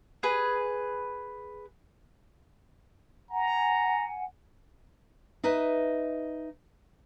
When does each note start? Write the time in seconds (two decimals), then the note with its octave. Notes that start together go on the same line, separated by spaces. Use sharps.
0.23 G#4 B4
3.30 F#5 G#5 A#5
5.44 D#4 B4 D#5 E5